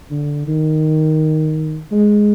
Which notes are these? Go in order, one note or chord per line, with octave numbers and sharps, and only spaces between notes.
D3
D#3
G#3